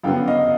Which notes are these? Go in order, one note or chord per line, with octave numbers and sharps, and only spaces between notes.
F#2 D3 F#3 B3 F5 G5
D#5 F5